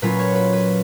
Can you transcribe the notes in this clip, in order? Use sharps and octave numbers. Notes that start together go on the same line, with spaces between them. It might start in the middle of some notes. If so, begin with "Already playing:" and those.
A#2 F#3 C#4 F4 B4
C#5
B4
B4